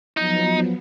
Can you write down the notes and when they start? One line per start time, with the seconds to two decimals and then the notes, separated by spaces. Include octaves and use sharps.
0.17 F3 F#3 B3 D#4